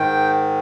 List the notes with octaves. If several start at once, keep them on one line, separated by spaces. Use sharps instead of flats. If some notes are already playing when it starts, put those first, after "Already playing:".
Already playing: G#2 D#3 G5